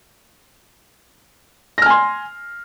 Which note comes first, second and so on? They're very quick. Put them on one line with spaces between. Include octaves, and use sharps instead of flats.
A#6 F6 G#5 C6